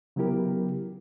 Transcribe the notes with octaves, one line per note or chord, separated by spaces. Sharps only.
C#3 F#3 B3 E4 G4 A#4